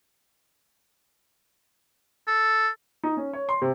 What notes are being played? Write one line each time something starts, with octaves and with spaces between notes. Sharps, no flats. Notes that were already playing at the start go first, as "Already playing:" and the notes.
A4
D#4
C#4
C#5
C6
C3